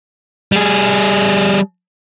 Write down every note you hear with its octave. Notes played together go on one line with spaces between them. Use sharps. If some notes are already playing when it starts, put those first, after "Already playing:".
G3 G#4